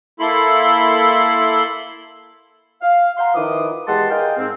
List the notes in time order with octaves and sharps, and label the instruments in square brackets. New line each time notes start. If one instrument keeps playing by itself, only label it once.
[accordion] A#3 E4 A4 B5 C6
[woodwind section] F5
F5 F#5 A#5 C6
D#3 F3 E4 B4 D6 D#6
E2 G#3 G4 F#5 A5 C6
G#4 A#4 D#5 F5 G5
G#2 C4